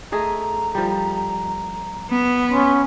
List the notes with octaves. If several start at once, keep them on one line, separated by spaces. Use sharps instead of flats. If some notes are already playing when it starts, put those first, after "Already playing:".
A3 G#4 D#5 A#5
F3 G3
B3
C#4 C6